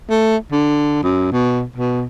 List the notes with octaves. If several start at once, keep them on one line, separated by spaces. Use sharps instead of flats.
A3
D3
F#2
B2
B2